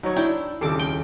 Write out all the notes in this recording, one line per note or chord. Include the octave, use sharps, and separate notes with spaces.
F#3 D#4 C#5
D4 E4 G5
D#1 F2 C#3 G4 A4 D6
G5